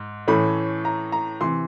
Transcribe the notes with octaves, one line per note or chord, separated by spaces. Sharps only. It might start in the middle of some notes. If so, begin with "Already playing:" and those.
Already playing: G#2
A2 E3 A3 C#4 B5
A#5
A#5
C3 E3 C6